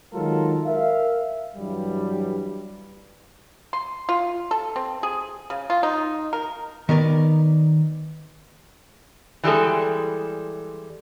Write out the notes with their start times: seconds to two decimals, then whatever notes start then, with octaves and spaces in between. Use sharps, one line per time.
0.13 D#3 F#3 G#3 F4 A4 A#4
0.65 A#4 E5 F5
1.56 G2 E3 F#3 G3
3.73 C6
4.09 F4
4.51 A4
4.76 C4
5.03 G#4
5.50 C#3
5.70 F4
5.83 D#4
6.33 A#4
6.89 D#3 B3 A#4 D5
9.44 E3 G3 G#3 A4